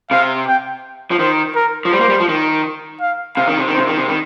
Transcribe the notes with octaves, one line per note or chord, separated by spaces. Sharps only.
C3 F5
G5
F3
D#3 C5
A#4
F3
G3 C5
A#3
G3
F3
D#3
F5
C3 F5
D#3
C3
D#3
C3 C5
D#3
C3
D#3